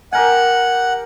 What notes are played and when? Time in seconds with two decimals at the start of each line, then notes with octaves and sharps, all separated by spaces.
0.13 G4 A#4 F#5 G#5